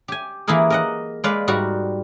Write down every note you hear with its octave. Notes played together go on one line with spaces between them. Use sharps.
G4 G#5
E3 A#3 E4 G#4 A#4
A#4 D#5 F#5
G#3 B4 D5 F5
G#2 G3 F#4 A#4